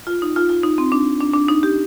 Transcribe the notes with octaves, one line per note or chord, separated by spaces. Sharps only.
F4
D#4
F4
F4
D#4
C4
D4
D4
D4
D#4
G4